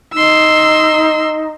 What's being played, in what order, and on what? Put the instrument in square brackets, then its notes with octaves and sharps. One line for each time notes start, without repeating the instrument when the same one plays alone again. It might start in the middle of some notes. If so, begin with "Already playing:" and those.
[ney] D#4 [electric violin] C6 E6